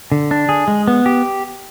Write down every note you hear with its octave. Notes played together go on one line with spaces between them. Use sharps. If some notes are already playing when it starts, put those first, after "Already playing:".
D3
D4
G#4
G#3
B3
G4